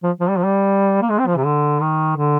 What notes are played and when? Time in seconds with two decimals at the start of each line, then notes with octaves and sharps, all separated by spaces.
0.03 F3
0.21 F3
0.30 G3
0.37 F3
0.44 G3
1.02 A#3
1.10 G#3
1.19 C4
1.27 F3
1.37 C3
1.45 D3
1.81 D#3
2.17 D3